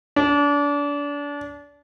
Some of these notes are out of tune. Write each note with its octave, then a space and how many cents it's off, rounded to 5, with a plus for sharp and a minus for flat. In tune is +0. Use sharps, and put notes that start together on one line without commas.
D4 -30